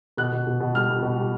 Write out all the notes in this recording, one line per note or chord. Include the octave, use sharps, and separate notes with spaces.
B2 F#6
B2
B2
B2
G3 F6
G3
B2
G3